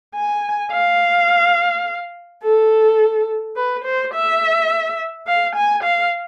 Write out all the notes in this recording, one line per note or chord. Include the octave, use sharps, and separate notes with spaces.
G#5
F5
A4
B4
C5
E5
F5
G#5
F5